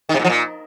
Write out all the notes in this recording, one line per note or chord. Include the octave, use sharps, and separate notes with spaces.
D#3
C3
A#2
F3
A#2